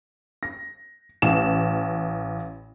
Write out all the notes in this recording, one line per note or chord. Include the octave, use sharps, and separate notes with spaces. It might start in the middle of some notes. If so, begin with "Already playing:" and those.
A#6
A1 E7